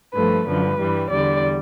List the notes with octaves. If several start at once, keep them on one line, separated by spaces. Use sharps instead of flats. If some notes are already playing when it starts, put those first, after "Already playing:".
G2 F3 A3 B4
G2 D3 F3 B4
G2 E3 G3
E2 D3 G3 D5